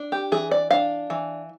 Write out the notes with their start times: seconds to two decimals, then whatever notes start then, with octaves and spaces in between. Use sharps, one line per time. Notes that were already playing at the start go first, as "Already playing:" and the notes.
Already playing: D4
0.12 G4
0.32 E3 G#4
0.51 D5
0.71 D4 F5
1.10 E3